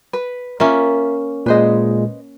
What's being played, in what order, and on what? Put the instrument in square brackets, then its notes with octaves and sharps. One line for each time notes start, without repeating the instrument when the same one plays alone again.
[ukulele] B4
[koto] A#3 C#4 [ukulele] F4 A#4 E5
[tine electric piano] A#2 G#3 [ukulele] B4 C5 D#5